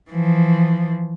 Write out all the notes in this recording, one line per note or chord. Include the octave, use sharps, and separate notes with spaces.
E3 F3